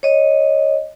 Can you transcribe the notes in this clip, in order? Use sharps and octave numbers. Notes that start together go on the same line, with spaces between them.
C#5 D#5